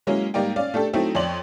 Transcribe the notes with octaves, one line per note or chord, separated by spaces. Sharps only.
F#3 G#3 A#3 C#4 E4
G#2 G3 A#3 D#4 D5 G5
C#4 D5 F5
A3 D4 G4 A4
F#3 A3 C4 D#4 E4
F2 C#5 D5 C6 F#7